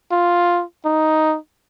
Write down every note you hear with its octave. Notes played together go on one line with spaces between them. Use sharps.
F4
D#4